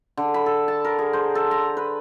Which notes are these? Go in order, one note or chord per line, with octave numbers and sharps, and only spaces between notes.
D3
B5
A4
A5
A#4
G#4
C5
A4
A#5
B4